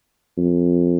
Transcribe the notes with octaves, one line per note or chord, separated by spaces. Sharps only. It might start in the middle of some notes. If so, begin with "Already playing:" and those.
F2